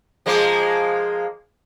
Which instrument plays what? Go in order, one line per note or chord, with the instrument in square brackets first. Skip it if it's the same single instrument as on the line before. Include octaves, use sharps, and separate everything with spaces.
[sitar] F3 G#3 A#3